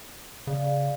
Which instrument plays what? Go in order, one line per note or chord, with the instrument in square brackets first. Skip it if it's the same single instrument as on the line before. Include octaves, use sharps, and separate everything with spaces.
[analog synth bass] C#3 [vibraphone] D5 F5